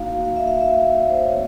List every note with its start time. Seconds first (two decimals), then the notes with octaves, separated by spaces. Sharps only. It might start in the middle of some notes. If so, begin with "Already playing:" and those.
Already playing: A#3 D#4 F#4 F5
0.25 F5
0.36 E5
0.47 F5
0.61 E5
0.95 D5
1.10 C5
1.20 C#5
1.30 A3 C4 D5